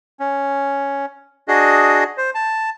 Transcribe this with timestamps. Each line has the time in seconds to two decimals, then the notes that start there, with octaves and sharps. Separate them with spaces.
0.20 C#4
1.48 D4 F#4 G#4 D#5
2.17 C5
2.35 A5